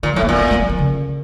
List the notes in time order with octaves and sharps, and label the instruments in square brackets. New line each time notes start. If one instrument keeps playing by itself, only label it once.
[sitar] A#2 [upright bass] D#3
[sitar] A2 [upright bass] F#3
[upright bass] A#3
[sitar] A#2 [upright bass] C4
[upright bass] A#3
A3
F#3
F3
C#3